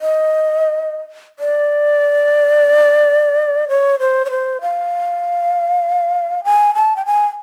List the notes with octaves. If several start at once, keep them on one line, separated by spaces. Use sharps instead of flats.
D#5
D5
C#5
C5
C#5
C5
F5
G#5
A5
G5
G#5